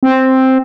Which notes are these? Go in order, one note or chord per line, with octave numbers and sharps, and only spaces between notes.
C4